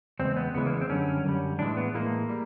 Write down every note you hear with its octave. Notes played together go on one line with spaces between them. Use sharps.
E2 C#3 G#3 C4
B3
E2 C#3 E3 G#3 B3
A#3
B3
C4
F#2 D3 G3 C#4
F#2 D3 G3
A2 E3 G#3 D4
B3
A2 E3 G#3 A#3
G3